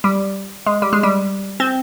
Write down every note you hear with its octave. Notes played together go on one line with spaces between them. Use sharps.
G3
G#3
G3
G#3
G3
C4